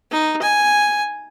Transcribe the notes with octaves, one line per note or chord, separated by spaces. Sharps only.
D#4
G#5